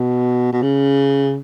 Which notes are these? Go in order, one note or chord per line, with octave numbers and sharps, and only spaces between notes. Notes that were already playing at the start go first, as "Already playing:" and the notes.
Already playing: B2
B2
C#3